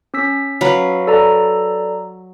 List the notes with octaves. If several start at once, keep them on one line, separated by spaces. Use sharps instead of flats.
C#4 E6 B6
F#3 B4 F5
A4 D5 A#5